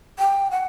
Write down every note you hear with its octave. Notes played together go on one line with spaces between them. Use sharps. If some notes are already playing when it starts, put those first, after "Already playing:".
G5
F#5